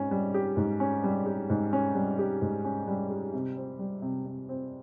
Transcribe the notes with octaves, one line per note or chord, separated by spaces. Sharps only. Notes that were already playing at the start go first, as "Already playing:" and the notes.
Already playing: G#2 C#4
G3
G4
G#2
C#4
G3
G4
G#2
C#4
G3
G4
G#2
C#4
G3
G4
C3
C4
G3
C3
C3
C4